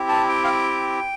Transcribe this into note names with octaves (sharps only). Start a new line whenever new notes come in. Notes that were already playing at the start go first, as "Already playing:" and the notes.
Already playing: C4 E4 G4
A5
G5
F5
G5